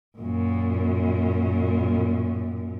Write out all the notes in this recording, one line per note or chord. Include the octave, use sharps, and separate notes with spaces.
F#2 A#2